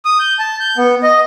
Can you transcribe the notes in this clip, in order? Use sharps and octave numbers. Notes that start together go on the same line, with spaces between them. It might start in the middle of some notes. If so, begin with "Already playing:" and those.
D#6
G6
A5
G6
B3
D#5